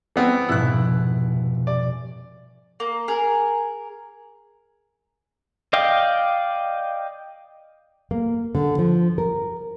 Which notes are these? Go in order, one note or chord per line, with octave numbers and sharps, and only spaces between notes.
E3 B3 C4
F1 G#2 B2 E4 F#6
D5
A#3
G#4 A#4
D5 D#5 F5 G5
A#3
D3
F3
A#4